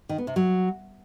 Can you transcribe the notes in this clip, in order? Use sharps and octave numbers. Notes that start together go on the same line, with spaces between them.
D#3
B3
C3
F#3